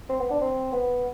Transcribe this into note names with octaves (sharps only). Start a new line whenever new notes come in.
C4
B3
D4
C4
B3